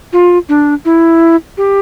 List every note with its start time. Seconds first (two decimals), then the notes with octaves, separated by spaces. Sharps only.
0.13 F4
0.49 D4
0.85 E4
1.57 G4